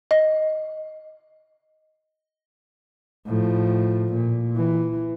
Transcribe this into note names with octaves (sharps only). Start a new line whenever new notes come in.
D#5
A2 F3
A#2
E3